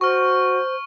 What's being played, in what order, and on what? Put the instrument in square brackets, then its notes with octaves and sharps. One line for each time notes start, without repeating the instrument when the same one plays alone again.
[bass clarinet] F#4 [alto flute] C5 [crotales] C#6 F6